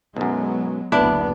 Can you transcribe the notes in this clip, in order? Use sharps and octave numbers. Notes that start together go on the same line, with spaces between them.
B1 F#2 F#3 G#3 B3
F#1 D2 B3 D4 E4 D5